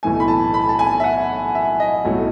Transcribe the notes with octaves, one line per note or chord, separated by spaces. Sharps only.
B1 A2 E3 A3 G#5
B5
A5
B5
A5
G#5
E5
F#5
E5
D#5
B1 A2 F#3 A3